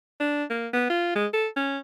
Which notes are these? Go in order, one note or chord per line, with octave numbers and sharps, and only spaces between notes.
D4
A#3
B3
F4
G#3
A4
C#4